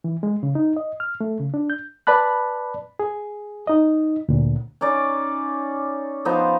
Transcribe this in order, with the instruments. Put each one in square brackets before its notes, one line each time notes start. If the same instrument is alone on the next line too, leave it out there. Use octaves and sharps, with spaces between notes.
[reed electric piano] E3
G#3
C#3
D#4
D#5
F6
A3
C#3
D4
G6
B4 D5 A5 B5 F#6
G#4
D#4 D#5
D2 A#2
[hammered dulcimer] C#4 D#4 D5
F3 B3 D#4 C5